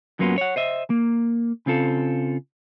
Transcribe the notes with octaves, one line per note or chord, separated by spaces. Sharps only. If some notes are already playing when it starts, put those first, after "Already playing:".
F#2 F#3 A#3 B3 F4
C#5 F#5
C5 D#5 E5
A#3
C#3 C4 F4 A4